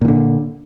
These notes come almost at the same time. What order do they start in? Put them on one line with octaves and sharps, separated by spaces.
A#2 D#3 D3